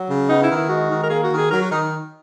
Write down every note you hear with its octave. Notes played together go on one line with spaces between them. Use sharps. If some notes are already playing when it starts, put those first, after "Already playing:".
Already playing: F#3
C#3
B3 D#4
E4
D#3
E4
G#3 F#4
D#3
A#4
A#3 G#4
F#4
D#3
G#4
F#3 A#4
F#4
D#3 D#4